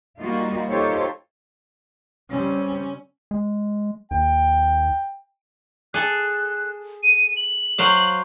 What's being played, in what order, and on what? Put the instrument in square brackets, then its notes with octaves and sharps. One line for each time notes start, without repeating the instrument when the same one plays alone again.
[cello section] G3 A#3 D#4 F4 F#4
D#4 F4 G4 A4 C5 C#5
[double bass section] C#3 G3 C4 [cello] C#4
[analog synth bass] G#3
[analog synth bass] D#2 [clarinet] G5
[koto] G#4 A4 [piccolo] F#6
[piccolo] D#7
F#7
[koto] F#3 C5 F5